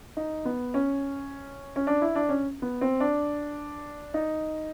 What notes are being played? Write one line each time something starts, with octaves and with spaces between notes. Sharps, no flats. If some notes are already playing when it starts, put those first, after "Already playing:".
D#4
B3
C#4
C#4
D4
E4
D4
C#4
B3
C4
D4
D#4